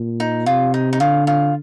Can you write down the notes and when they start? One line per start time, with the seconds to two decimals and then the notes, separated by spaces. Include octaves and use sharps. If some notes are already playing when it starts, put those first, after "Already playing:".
Already playing: A#2
0.20 D#4
0.46 C3 F4
0.74 D#4
0.93 D#4
1.00 D3 F4
1.27 F4